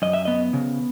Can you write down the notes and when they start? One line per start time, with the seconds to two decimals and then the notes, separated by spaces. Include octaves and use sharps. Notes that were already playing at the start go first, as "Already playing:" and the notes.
0.02 F#2 D#5
0.13 E5
0.25 B3 D#5
0.53 C#3